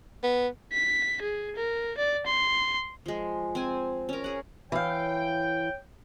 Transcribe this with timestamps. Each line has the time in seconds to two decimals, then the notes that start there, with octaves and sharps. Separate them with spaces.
0.23 B3
0.73 B6
1.22 G#4
1.56 A#4
1.98 D5
2.27 C6
3.06 F3 G#3
3.55 C4 G#5
4.09 C#4 A#4
4.24 G#4 F#5
4.72 E3 C#5 F5 G5